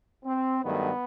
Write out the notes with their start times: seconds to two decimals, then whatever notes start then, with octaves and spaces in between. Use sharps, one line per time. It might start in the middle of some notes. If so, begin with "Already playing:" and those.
0.25 C4
0.63 G2 D#3 F#3 A3 B3